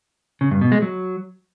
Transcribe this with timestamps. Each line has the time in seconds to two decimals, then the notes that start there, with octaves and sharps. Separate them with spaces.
0.41 C#3
0.51 G2
0.61 B2
0.72 G#3
0.82 F#3